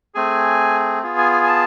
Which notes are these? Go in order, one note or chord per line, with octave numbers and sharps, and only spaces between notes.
A3 C4 G#4 G#5
B3 F4 G#4
G#5
G#5
G#5
A5